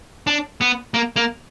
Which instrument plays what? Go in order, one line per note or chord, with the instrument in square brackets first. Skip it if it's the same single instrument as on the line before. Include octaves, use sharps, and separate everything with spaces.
[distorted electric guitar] D4
B3
A#3
A#3